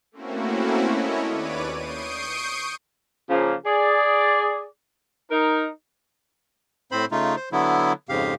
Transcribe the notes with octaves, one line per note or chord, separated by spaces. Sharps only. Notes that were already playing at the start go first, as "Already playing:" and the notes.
A3 A#3 C4 C#4 E4 F#4
C#4 E4 A4 C#5 D#5
D#2 B4 C#5 D5 D6 D#7
C#6 D#6 G6 C7 D7 D#7
C#3 F3 A#3
G#4 D5
D#4 A#4
A2 C4 C5 B5
C#3 A3 D#4 F4
C5
D3 F#3 B3 E4
F2 G#2 C#3 G4 F5